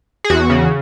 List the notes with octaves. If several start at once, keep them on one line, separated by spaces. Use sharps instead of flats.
G#4
E2 F#4
C#3